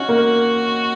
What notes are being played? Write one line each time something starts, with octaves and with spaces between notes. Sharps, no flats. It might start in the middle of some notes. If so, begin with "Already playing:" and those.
Already playing: C#4 D#4 F#4 C#5 D#5
A#3 A#4